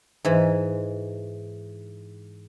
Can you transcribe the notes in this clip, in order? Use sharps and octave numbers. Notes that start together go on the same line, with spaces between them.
G#2 E3